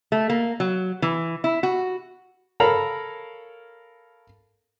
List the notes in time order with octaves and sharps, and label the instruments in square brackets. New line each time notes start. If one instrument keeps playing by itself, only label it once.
[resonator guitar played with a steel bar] A3
A#3
F#3
E3
E4
F#4
[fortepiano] A4 A#4 C#5 F5 A#5 B5